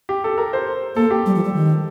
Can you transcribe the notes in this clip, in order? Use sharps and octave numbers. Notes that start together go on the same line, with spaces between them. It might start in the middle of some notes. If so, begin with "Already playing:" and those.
G4
A4
A#4
C5
A#3 A4
G4
G3
F3
G3
D#3